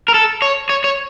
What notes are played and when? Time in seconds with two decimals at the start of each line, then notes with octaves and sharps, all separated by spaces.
0.08 A#4
0.14 A4
0.42 C#5
0.69 C#5
0.84 C#5